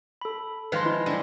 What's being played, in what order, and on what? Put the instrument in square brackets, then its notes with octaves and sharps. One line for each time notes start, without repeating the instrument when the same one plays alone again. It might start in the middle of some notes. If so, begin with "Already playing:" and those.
[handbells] A4 B5
[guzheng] D#3 F3 G#3 [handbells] B4 F5 C6
[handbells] E4
[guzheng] D3 G3 G#3